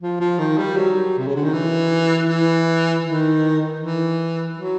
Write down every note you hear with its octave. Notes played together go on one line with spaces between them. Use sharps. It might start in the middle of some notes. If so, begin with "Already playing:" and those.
F3
F3
D#3
G3
F#3
C3
C#3
D3
D#3
E3
E3
D#3
E3
F#3